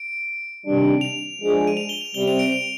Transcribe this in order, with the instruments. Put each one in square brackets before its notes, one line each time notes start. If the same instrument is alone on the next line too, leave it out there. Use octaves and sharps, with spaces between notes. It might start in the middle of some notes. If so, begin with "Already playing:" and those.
Already playing: [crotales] D7
[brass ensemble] C3 D#3 G3 D4
[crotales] F7
[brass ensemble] F3 G#3 D4 G#4
[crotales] D#7
F7
G7
F7
[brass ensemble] C3 G3 C4 [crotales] G7
[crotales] F7
D7
F7